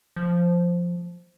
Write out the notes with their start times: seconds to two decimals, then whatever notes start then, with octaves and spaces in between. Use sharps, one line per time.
0.16 F3